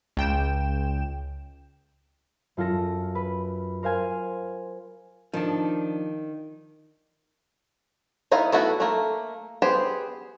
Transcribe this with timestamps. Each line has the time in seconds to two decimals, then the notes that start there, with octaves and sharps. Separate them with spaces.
0.17 C#2 G5 E7
2.57 F#2 F4 A4 A#6
3.15 B4
3.83 A#4 C5 F5 G#5
5.33 D#3 F3 D4
8.32 B3 D#4 E4 D#5 F5
8.52 A3 B3 E4 F#4
8.80 A3 A#3
9.62 B3 G4 G#4 C5